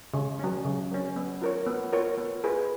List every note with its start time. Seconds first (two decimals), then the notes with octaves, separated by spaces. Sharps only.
0.14 C#3
0.39 F#3 C#4
0.65 C#3
0.91 F#3 C#4
1.16 B3
1.42 F4 A#4 C#5
1.67 B3
1.93 F4 A#4 C#5
2.18 B3
2.44 F4 G#4 B4